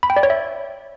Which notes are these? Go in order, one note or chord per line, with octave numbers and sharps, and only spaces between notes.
B5
G5
D5
C#5
E5